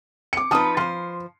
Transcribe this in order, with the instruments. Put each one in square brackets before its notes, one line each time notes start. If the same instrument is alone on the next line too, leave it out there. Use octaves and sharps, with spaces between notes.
[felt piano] D6 C#7
[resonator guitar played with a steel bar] F3 D#4 B4 [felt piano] A5 D#6
[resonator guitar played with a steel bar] F3 C5 [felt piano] C6